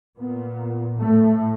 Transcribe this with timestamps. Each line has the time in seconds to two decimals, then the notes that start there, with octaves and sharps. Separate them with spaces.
0.18 A#2 B3
0.99 A2 A3